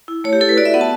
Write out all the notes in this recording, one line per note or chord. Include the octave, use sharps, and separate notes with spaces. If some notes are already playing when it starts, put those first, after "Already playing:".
E4
A3 C#5
G4
E4 A4
B4
F#4 D5
E5
B3 F#5
A5